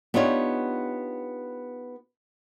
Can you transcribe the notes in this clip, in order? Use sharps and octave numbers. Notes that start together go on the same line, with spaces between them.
B3 D4 D#4 F4 G4 C#5